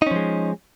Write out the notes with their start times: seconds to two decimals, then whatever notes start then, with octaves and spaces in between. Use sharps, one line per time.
0.02 D#4
0.07 C#4
0.11 F3
0.16 G#3